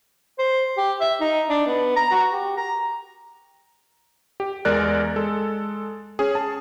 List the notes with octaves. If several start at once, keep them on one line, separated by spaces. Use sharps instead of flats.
C5
G4
E5
D#4
D4
B3
A#5
F#4
G4
A#5
G4
E2 G#3 A#4 D5 F#6
G#3 A4
C#4 G#4
A5